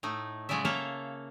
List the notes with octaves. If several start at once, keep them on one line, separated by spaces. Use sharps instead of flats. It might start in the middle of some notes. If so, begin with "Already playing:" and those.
A2 A3 D#4
C#3 F#3 G#3 F4 D5 E5
A#3 A4 C#5 E5 F5